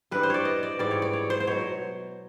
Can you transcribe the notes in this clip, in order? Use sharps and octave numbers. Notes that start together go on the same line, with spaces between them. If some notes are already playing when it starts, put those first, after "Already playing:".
G2 E3 G3 B4
C5
C#5 D5
D#5
D5
G#2 E3 G3 D5
C#5
D5
C#5
C5
C5
B2 F#3 C#5